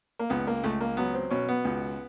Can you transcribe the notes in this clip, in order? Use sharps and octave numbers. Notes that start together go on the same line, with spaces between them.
A#3
C#2 B3
A#3
C#2 A3
A#3
F#3 B3
C4
B2 C#4
B3
C#2